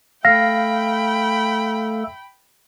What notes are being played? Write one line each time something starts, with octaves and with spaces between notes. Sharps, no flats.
A3 A4 F5 G5 B5 A#6